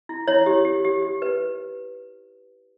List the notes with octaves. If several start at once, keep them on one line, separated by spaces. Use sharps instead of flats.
E4
E4 C#5
G4
G4
G4
G4
B4